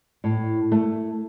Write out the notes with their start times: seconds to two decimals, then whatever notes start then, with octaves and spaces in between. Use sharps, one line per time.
0.24 A2
0.72 A3